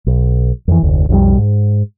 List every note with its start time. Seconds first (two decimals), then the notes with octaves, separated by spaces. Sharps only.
0.07 B1
0.68 F2 E3
0.83 F1 D2
1.09 B1 F2 D3 G3
1.38 G#2